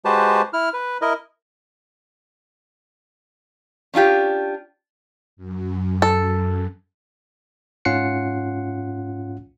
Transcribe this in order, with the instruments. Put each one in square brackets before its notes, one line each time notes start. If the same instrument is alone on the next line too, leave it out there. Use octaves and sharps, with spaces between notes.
[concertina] G#3 F#4 G4 B4 C5 A5
E4 F6
B4
E4 A#4 D#5
[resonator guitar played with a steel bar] C#4 D4 F4 G4
[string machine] F#2
[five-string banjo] A4
[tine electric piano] G#2 C#4 F4 F#5 C7 C#7